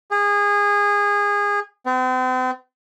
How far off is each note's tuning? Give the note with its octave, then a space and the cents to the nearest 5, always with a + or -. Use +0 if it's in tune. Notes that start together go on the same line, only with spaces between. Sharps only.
G#4 -25
C4 -40